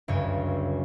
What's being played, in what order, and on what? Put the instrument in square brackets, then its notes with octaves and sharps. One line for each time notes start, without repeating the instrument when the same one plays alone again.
[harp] G1 C#2 F#2 C#5